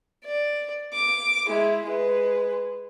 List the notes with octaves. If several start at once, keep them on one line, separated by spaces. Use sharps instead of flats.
D5
D6
G#3 E4
G#3 B4